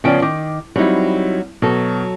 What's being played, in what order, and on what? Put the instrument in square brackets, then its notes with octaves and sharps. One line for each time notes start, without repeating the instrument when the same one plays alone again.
[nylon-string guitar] C#3 F3 G5 [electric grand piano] B3 C#4 D5
[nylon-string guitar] D#3 [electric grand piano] D6
[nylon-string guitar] F#3 D#4 [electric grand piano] G3 C4 E4
[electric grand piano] B2 [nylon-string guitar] F#3 A4